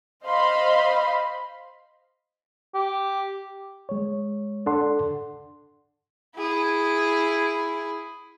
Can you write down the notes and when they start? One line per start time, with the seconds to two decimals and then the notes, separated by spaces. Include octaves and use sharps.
0.25 C5 D#5 F5 B5 C6
2.74 G4
3.89 G#3 C#5
4.66 D4 A4 D5 F#5 C6
6.36 E4 G#4